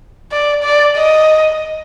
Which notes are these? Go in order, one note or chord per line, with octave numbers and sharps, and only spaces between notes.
D5
D5
D#5